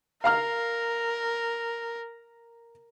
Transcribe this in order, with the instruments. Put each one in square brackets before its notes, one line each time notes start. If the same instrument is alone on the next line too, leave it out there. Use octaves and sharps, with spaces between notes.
[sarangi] A#4 [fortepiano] F5 A#5 F6